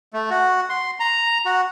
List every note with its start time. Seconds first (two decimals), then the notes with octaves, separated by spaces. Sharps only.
0.13 A3
0.30 F#4
0.70 C6
1.00 A#5
1.46 F#4